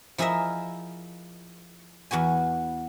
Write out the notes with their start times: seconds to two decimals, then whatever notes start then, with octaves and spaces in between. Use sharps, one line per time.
0.18 F3 E4 G#4 A#4 D#5 E5
2.11 E2 B3 F#4 G#5